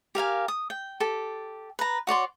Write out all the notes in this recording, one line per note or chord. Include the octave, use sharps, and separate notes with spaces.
G4 A#4 F5 G#5
D#6
G5
G4 A4
B4 A#5
F#4 C#5 D5 C6